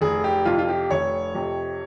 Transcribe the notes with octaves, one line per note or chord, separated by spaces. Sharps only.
F1 G#4
G4
F2 C3 F4
F4
G4
F1 C#5
F2 C3